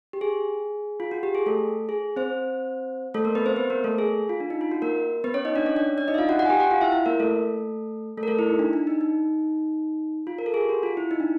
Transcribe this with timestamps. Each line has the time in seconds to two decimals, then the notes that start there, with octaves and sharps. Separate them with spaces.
0.13 G4
0.21 G#4
1.00 F4
1.11 F#4
1.23 G4
1.35 G#4
1.46 A3 A4
1.89 G#4
2.16 C4 C5
3.14 A3 A4
3.25 A#3 A#4
3.35 B3 B4
3.46 C4 C5
3.56 B3 B4
3.70 A#3 A#4
3.84 A3 A4
3.98 G#4
4.29 F4
4.40 D4
4.50 D#4
4.61 F4
4.72 F#4
4.82 A#3 A#4
5.24 B3 B4
5.34 C#4 C#5
5.45 D#4 D#5
5.55 D4 D5
5.66 C#4 C#5
5.76 D4 D5
5.98 D4 D5
6.08 D#4 D#5
6.14 E5
6.18 F4 F5
6.29 F#4 F#5
6.39 F#4 F#5
6.45 G#5
6.49 G4 G5
6.60 F#4 F#5
6.71 F4 F5
6.81 E4 E5
6.92 E4 E5
7.06 A#3 A#4
7.20 A3 A4
8.17 A3 A4
8.23 A#4
8.28 A3 A4
8.38 E4
8.49 D#4
8.59 D4
8.73 D4
8.87 D#4
9.01 D#4
10.27 F4
10.39 A#4
10.46 A4
10.54 G#4
10.61 G4
10.69 F#4
10.83 F4
10.97 E4
11.11 D#4
11.20 D4